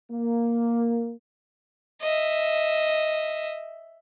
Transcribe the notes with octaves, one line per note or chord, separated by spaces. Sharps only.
A#3
D#5 E5